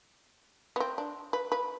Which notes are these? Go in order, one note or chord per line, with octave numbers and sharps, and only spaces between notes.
B3
C4
D4
B4
B4